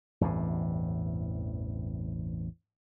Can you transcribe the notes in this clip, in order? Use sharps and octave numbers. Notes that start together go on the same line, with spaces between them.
A1 E2 G2 C3